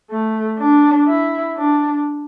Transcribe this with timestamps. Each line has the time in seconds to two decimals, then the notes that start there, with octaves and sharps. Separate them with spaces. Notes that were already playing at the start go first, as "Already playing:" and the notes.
0.11 A3
0.59 D4
1.08 E4
1.57 D4